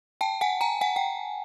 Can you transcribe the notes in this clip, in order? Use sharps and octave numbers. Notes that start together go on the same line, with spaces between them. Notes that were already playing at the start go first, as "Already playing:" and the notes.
G5 A5
F#5 G#5
G#5 A#5
F#5 G#5
G5